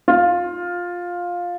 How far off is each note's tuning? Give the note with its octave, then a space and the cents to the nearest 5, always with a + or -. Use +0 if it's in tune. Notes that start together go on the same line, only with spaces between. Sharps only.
F4 +10